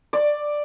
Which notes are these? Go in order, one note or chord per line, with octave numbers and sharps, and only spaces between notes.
D5